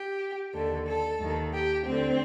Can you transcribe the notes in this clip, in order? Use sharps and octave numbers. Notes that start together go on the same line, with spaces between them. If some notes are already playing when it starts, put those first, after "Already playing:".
Already playing: G4
D#2 D3 A4
A4
D#2 D#3
G4
D2 D3 C4